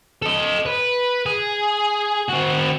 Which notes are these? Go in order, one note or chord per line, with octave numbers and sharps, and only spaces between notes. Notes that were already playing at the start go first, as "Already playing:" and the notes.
A4 D#5
B4
G#4
C4 F#4